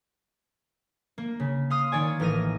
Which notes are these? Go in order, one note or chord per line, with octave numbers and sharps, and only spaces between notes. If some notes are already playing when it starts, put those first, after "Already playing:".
A#3
C#3
F5 C6 D#6 F6
D#3 C#5 D5 G#5
A1 E3 A#4 F6 A#6 D#7